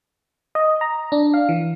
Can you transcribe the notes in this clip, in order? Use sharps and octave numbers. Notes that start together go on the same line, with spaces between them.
D#5
A#5
D4
F5
E3